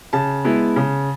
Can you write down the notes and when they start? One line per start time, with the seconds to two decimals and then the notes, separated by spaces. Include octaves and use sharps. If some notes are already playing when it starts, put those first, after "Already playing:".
0.13 C#3 A5
0.44 G#3 B3 E4
0.76 C#3